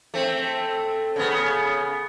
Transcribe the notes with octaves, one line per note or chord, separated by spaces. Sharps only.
A3 C4
C#3 B3